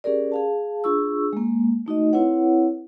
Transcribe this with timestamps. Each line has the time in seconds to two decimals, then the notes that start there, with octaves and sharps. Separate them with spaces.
0.04 C#4 G4 G#4 A#4 D5
0.32 G#4 F5 A5
0.84 D4 F4 G#4 C#6 E6
1.33 G#3 A#3
1.86 A3 D#4 F#4 D#5
2.13 C4 E4 B4 C#5 F#5